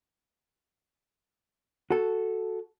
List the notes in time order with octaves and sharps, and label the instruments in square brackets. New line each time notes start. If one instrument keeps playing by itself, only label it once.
[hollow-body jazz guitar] F#4 A4